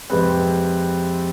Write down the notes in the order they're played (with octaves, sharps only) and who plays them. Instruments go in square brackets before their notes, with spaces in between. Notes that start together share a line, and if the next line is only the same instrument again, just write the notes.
[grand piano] F2 C3 G#3 C4 B4